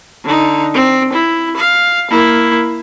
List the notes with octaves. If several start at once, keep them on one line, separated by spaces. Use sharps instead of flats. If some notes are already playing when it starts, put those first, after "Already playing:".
D3 D#4
C4
E4
F5
A#3 E4